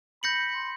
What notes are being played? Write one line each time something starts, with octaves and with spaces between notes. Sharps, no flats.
B5 G6 A#6 C#7 F#7
C6